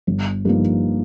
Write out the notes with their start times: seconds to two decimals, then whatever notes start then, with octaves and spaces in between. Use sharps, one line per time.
0.07 G1
0.45 G2 F3 A#3 D#4